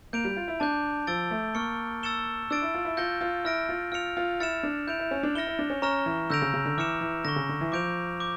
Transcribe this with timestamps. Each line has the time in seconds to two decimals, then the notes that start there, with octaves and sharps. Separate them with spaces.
0.13 A#3 G6 D7 F7
0.25 G3
0.37 F4
0.48 E4
0.60 D4 A5 D6 G6
1.07 F3 E6 A6 D7 G7
1.31 A3
1.55 A#3 C#6 F6 C#7 G7
2.03 E6 A6 C#7 E7 G7
2.50 D4 E6 A6 D7
2.62 E4
2.74 F4
2.85 E4
2.97 F4 G6 A#6 C#7 G7
3.21 F4
3.45 E4 F6 A#6 D7
3.69 F4
3.92 F4 F6 C#7 F7
4.17 F4
4.40 E4 F6 A6 C#7 E7
4.63 D4
4.87 E4 G6 D7 F7
4.99 E4
5.11 C#4
5.23 D4
5.35 E4 F6 A#6 C#7 E7 G7
5.47 E4
5.59 D4
5.70 C#4
5.82 C#4 A#5 C#6 F6 A#6 E7
6.06 E3
6.30 D3 E6 G6 A#6 D7 F7
6.42 C#3
6.54 C#3
6.65 D3
6.78 E3 D6 F6 C#7 E7
7.01 E3
7.25 D3 C#6 G6 A#6
7.36 C#3
7.49 D3
7.61 E3
7.72 F3 D6 G6 D7 F7
8.20 D6 G6